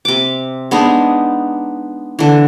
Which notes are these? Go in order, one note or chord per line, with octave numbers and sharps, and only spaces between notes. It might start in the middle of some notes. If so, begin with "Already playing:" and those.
C3 D6
G#3 B3 D4 D#4
D3 E3